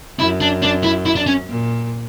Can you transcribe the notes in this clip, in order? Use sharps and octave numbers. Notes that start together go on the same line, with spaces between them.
F#2 E4
D4
D4
E4
E4
D4
C#4
A#2